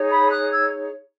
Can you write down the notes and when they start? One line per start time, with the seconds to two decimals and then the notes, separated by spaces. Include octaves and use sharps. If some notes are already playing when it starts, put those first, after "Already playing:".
Already playing: D#4 G#4 C#5
0.10 B5 D#6
0.30 D#6 F#6
0.51 E6 G#6